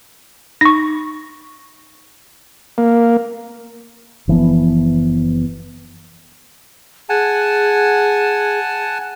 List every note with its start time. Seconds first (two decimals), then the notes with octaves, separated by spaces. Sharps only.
0.61 D#4 C#6 A#6
2.78 A#3
4.28 F#1 E3 F3 B3
7.09 G#4 F#5 G#5 A5